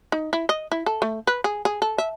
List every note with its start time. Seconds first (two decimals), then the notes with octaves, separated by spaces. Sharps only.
0.12 D#4
0.33 E4
0.49 D#5
0.72 E4
0.86 A4
1.02 A3
1.27 B4
1.44 G#4
1.65 G#4
1.82 A4
1.98 E5